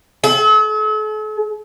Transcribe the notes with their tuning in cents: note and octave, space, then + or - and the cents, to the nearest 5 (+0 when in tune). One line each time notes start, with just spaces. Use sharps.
A4 -45